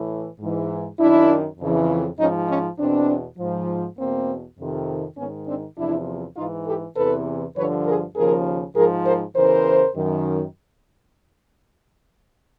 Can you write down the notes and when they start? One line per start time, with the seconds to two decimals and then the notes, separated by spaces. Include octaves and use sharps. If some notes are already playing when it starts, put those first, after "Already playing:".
Already playing: A2 E3
0.40 G#2 E3
1.00 F#2 D#3 D4 E4
1.60 F2 C#3 E3
2.20 G#2 F3 C#4 D#4
2.50 C#4 D#4
2.79 E2 B2 C4 D4
3.39 G#2 F3
3.99 E2 B2 A#3 C4
4.59 F2 C3 D#3
5.17 G#2 D#3 B3 C#4
5.47 C4 D4
5.78 E2 C3 F3 D4 E4
6.37 G#2 E3 D#4 F4
6.67 G4 A4
6.97 E2 C3 E3 A4 B4
7.57 G2 D3 F3 B4 C#5
7.86 G#4 A#4
8.16 D#2 C#3 F3 G#4 A#4
8.76 G#2 F3 G#4 A#4
9.06 A#4 C5
9.36 E2 C#3 E3 A#4 C5
9.95 F#2 D#3